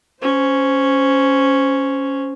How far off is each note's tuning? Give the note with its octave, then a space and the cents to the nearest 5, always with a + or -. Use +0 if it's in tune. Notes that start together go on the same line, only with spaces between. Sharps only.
C#4 +0 C5 -5